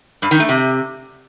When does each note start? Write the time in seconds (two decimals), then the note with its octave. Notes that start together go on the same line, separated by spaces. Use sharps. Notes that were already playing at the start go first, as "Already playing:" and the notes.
0.22 G2
0.31 D#3
0.40 A3
0.49 C3